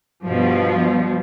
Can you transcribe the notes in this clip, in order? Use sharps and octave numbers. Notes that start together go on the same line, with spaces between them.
G2 B2 F3 G3